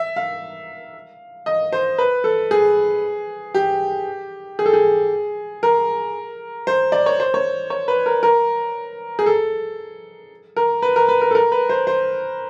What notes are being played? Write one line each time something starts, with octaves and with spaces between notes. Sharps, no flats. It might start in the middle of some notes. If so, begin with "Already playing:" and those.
Already playing: E5
F5
D#5
C5
B4
A4
G#4
G4
G#4
A4
G#4
A#4
C5
D5
C#5
C5
C#5
C#5
B4
A#4
A#4
G#4
A4
A#4
B4
A#4
B4
A#4
A4
A#4
B4
C5
C5